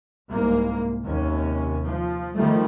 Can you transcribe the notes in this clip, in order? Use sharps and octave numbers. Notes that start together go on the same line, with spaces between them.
C2 G#2 A#3
D#2 C3 C#4
F3
D#3 F3 G3 A3